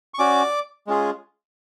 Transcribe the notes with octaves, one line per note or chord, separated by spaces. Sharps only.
C#6
C#4 F#4 D5 D6
G#3 C#4 F4 G#4